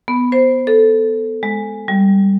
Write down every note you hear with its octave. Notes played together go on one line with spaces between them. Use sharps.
B3
C5
A4
G#3
G3